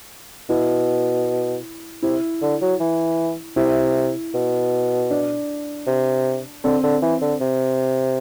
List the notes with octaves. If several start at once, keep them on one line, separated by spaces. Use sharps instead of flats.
B2 E4
C3 E4
D3
F#3
E3
C3 E4
B2
D4
C3
D3 C4
D3
E3
D3
C3